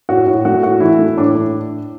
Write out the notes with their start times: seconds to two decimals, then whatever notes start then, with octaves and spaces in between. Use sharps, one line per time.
0.09 A2 F#4
0.27 A2
0.45 A3 F#4
0.63 A2 F#4
0.80 E3 E4
0.99 A3
1.17 A2 D4
1.35 A2